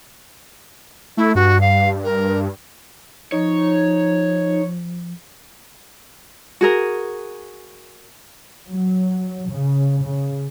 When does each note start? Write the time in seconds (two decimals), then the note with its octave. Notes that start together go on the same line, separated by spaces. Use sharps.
1.17 A3 E4
1.35 G2 F#4
1.61 F5
2.04 A#4
3.32 F3 D#4 C#5
6.61 F#4 G#4 A#4
8.68 F#3
9.50 C#3
10.02 C#3